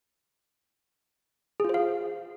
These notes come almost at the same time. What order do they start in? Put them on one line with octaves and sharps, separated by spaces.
G#4 F4 C5 F5